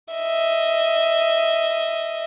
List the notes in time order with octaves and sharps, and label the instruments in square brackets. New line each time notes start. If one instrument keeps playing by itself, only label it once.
[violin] D#5 E5